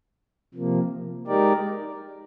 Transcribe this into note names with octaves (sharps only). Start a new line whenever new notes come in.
C3 F3 A#3
G#3 D#4 G4 A#4 D5